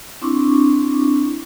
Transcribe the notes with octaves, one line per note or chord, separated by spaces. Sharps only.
C4 D4 E4 C#6 D6